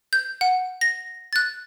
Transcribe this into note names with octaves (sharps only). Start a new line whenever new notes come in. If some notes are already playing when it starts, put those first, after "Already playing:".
G6
F#5
A#6
F#6 A6